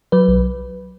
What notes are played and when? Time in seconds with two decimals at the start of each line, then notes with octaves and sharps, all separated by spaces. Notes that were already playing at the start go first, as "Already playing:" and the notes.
0.12 F#3 B4
0.28 B1